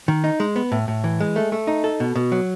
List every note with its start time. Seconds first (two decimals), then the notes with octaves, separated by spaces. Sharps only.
0.08 D#3
0.24 D#4
0.40 G#3
0.56 B3
0.72 A2
0.88 A2
1.04 E3
1.21 G#3
1.36 A3
1.52 A3
1.67 D#4
1.84 A4
2.00 B2
2.15 B2
2.32 F#3